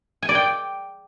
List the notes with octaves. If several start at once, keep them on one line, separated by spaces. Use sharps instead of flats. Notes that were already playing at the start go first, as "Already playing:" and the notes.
G#5
D5
G5